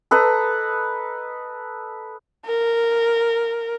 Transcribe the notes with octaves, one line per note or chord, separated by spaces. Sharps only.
A4 B4 D#5 A#5
A#4